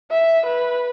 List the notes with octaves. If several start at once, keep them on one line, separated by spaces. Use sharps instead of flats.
E5
B4